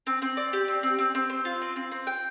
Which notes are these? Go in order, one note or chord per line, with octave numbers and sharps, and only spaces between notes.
C4
C4
D5
G4
C4
C4
C4
C4
C5
F4
C4
C4
C4
G5